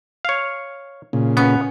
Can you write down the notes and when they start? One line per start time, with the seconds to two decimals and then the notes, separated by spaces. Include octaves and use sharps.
0.25 C#5 F5
1.13 A#2 C#3
1.37 B3 C#4